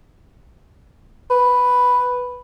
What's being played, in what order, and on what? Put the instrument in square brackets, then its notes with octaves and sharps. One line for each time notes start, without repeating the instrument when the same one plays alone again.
[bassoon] B4